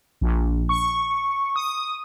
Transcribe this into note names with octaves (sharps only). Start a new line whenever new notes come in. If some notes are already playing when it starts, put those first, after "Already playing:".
A#1
C#6
D#6